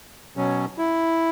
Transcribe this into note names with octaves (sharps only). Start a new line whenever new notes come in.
B2 F#3 C#4
E4